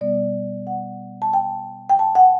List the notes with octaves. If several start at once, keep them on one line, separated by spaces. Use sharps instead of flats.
B2 G3 B3 D5
F#5
A5
G5
G5
A5
F#5